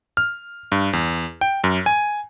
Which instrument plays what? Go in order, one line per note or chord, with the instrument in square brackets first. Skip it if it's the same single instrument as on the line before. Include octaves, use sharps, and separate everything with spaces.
[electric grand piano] F6
G2
E2
G5
F#2
G#5